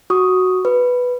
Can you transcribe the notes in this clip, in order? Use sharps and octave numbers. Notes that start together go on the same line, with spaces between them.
F#4 C#6 D#6
B4